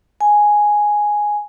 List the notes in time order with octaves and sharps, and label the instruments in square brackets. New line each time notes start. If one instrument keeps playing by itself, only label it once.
[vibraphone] G#5